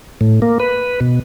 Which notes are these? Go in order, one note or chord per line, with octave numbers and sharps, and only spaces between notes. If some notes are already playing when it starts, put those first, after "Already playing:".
A2
A#3
B4
B2